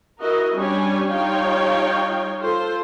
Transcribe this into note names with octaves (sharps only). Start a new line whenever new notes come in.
E4 F#4 A#4 D#5
G3 C#4 D4 G4 C#5 G#5
G3 D#4 F4 C#5 F5 G5
F4 A4 C5